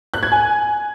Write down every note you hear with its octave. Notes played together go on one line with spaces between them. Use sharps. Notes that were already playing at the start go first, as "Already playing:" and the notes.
F#6
G#6
G#5